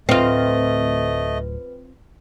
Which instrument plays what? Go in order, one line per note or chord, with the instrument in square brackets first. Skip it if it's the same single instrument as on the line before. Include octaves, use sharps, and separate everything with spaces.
[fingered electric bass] D1 G1 A2 [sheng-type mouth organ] A3 D#5 [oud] C4 F4 [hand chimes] B4